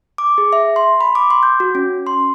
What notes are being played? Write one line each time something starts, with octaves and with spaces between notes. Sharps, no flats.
D6
G#4
E5
C6
B5
D6
C6
G6
F#4
C#4
C6